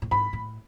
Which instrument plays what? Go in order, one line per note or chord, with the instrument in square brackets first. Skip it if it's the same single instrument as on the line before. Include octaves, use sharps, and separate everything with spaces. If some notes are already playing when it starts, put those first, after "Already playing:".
[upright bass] A2
[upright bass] G#2 [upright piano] B5
[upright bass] A2